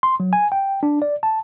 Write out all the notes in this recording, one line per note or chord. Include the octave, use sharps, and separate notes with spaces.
C6
F#3
G#5
G5
D4
D5
A5